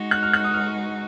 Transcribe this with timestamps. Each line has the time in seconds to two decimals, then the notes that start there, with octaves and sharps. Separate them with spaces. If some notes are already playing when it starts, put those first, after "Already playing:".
Already playing: G#3 D#4 F#4
0.11 F#6
0.23 F6
0.33 F#6
0.44 D#6
0.54 F6